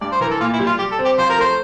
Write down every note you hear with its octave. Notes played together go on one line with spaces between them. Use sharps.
G2 D5
C5
E3 A#4
A4
A#2 F4
E4
G3
F4
G3 G4
A4
C4
G4
F3 C5
A#4
A3 C5